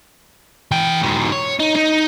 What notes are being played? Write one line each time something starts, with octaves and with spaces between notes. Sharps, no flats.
E3 G5
G#2 B2
C#5
D#4
D#4